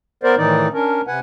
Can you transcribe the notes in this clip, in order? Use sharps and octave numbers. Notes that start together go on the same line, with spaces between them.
B3 A#4 C5 D5
A2 D#3 E3 D#4 D5
C#4 D4 A#4
C3 B4 F#5 G#5